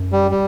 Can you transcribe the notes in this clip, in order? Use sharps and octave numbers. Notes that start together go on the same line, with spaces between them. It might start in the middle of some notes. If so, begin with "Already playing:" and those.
Already playing: F#2
G3
G3